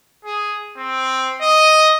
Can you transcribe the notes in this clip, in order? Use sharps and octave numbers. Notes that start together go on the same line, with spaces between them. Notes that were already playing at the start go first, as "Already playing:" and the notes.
G#4
C4
D#5